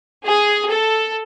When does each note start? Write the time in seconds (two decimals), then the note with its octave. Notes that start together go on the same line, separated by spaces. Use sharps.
0.25 G#4
0.70 A4